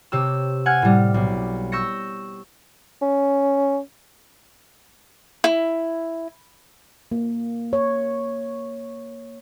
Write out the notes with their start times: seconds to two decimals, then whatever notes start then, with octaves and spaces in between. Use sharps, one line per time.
0.12 C3 G4 C#5 E6
0.66 F#5 G#5 F6 G#6
0.82 A2 G3
1.14 B1
1.72 C#6 E6 G6 A#6 C#7
3.02 C#4
5.44 E4
7.12 A#3
7.73 C#5